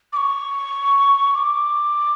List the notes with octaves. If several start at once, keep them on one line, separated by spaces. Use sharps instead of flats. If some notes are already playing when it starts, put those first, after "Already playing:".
D6
C#6
D6